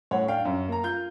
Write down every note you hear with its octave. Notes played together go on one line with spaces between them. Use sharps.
A2 C#5 F#5
D4 F5 G5
F#2
A#3 A#5
F4 G6